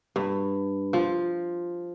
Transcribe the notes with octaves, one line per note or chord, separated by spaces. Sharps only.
G2
F3